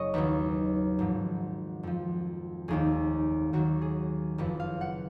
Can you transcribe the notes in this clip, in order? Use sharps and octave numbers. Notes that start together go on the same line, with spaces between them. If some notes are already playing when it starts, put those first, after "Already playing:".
Already playing: F#1 G#4 C#5 D#5
D#2 D#3 F#3 B4
G#1 G#2 F3
F2 F3
F1 D#2 D#3 G#4
D#2 D#3 F#3 F#4
G#4
F#1 F2 F3 B4
F5
F#5